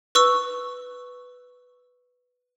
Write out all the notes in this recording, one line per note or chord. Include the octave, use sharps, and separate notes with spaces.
B4 C#6 E6